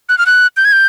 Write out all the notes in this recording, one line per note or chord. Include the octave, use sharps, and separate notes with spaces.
F#6
F6
F#6
G6
G#6
G6